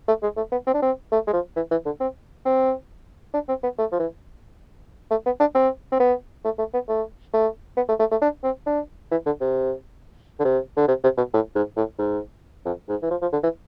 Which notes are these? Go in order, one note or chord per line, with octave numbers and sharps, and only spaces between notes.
A3
G#3
A3
B3
C4
D4
C4
A3
G#3
F3
E3
E3
D3
C4
C4
D4
C4
B3
A3
F3
E3
A3
B3
D4
C4
C4
B3
A3
A3
B3
A3
A3
B3
A3
A3
A3
D4
C4
D4
E3
D3
C3
D3
C3
D3
C3
C3
B2
A2
G#2
A2
G#2
F2
G#2
E3
F3
F3
D3
E3